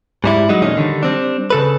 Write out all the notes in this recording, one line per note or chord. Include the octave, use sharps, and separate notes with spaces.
G#2 G3 E4
F#3 G#3 D#4
F2 A#2 D#3 C#4 D#4
D3 D#3 G3
G3 C4 D4
C#3 A4 B4